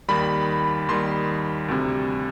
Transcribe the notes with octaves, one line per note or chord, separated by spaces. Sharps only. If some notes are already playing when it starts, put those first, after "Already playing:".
D#2 D#3 G3 B5
D#2 D#3 G3 C6
D2 C3 G3